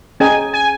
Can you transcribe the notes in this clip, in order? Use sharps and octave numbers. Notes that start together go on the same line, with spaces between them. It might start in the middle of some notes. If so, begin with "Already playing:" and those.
C#4 G#4 D#5 G5 G#5 A#5
G#5